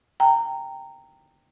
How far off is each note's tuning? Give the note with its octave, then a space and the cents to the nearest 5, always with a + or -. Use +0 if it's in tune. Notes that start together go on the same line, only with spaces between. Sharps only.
G5 +0 A#5 -20